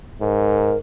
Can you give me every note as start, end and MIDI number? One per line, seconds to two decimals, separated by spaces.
0.21 0.75 44
0.21 0.78 70